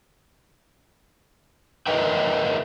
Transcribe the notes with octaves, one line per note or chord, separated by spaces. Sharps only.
G#4 A#4 B4 D#5 E5 G5